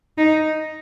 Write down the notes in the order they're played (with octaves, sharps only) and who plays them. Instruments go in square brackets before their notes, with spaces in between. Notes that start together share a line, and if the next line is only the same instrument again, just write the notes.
[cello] D#4